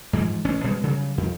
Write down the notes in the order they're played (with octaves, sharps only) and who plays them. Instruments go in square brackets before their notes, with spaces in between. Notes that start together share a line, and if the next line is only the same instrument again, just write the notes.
[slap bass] G#2 E3 F3
A1 C#4
B2 G3 G#3
C#3 F#3 G3
F2